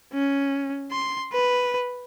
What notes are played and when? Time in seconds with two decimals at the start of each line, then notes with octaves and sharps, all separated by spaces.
0.13 C#4
0.91 C6
1.33 B4